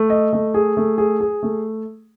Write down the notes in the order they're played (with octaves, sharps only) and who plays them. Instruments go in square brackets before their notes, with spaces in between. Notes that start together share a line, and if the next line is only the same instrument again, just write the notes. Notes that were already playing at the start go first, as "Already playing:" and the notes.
Already playing: [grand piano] A3
D#5
A3
G#4
A3
G#4
G#4
A3